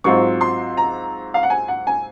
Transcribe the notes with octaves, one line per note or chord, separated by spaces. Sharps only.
G#2 F#3 C4 F4 C#6
C6
A#5
F5
F#5
G#5
F#5
G#5